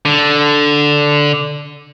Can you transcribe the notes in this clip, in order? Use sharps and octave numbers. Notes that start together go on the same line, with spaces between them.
D3